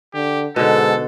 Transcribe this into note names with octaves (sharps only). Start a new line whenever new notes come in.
D3 G4
G#2 B2 D3 A4